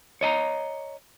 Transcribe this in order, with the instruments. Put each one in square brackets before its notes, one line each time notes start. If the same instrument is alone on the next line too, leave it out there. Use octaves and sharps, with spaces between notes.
[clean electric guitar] C#5 D#5 A5 A#5